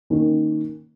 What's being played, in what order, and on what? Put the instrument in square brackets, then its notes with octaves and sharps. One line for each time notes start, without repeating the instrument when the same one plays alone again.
[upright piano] D#3 A#3 C#4